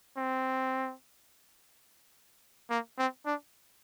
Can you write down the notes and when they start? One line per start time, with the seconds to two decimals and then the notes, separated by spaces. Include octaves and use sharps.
0.17 C4
2.70 A#3
2.98 C4
3.26 D4